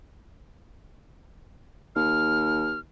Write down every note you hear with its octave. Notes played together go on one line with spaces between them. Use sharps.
D#2 F6